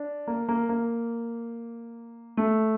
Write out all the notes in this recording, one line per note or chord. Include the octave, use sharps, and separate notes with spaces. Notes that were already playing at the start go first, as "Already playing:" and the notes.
Already playing: D4
A#3
A#3
A#3
A3